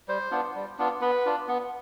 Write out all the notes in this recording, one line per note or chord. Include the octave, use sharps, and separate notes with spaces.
G3 C5
B3 D4 F4
G3
B3 D4 F4
B3 B4
D4 F4
B3